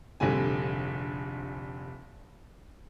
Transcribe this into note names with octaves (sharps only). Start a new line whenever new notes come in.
F1 A#1 D3 G3 G#5